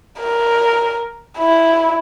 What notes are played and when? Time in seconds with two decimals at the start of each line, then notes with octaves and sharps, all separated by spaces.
0.20 A#4
1.39 E4